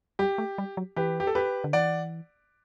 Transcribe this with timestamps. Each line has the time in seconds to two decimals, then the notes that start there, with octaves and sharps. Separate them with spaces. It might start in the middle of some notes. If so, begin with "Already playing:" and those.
0.19 G3 G4
0.38 A3
0.58 G3
0.77 F#3
0.96 E3 G4 B4
1.20 G4
1.27 A4
1.35 G4 B4
1.64 D3
1.73 E3 D5 F#5